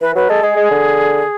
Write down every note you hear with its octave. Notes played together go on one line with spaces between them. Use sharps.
E3 B4
F#3 B4
G#3 A4
G#3 G#4
G#3
D3